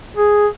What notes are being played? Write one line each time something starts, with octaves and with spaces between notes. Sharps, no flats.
G#4